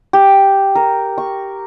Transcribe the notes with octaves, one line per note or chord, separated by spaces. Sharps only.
G4
A#4
C#6